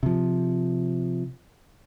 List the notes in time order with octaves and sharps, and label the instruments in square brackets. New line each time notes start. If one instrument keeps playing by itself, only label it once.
[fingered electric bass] C3 F3